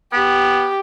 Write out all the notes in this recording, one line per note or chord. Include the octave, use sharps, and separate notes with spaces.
B3 G4